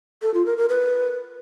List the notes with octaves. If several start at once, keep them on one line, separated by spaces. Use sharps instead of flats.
A4
F4
A#4
A#4
B4